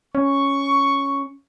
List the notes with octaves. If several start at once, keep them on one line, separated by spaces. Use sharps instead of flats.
C#4 C#6